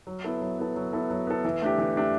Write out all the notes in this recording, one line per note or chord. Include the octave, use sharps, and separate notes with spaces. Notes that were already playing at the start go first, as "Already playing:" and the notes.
F#3
B3 E4 A4
F#3
B3 E4 A4
F#3
B3 E4 A4
F#3
B3 E4 A4
E3
A3 D4 G4
E3
A3 D4 G4